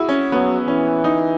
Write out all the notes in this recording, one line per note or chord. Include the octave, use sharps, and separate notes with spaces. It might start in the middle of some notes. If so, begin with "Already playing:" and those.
Already playing: E4 F#4 G#4
C#4
F#3 B3
E3 C#4
D#4